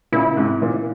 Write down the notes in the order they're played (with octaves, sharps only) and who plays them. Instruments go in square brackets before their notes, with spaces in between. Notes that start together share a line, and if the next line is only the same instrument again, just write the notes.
[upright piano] A#2 C#3 [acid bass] E4
[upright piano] G#2 C3
A#2